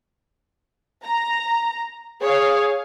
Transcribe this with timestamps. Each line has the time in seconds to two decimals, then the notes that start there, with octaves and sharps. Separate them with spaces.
1.03 A#5
2.21 G#4 C#5 F5